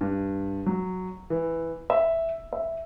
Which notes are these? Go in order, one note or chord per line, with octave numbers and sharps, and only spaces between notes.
G2
F#3
E3
E5
E5